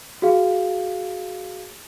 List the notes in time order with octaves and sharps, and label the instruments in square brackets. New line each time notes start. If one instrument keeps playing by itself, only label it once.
[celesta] F#4 G#4 F5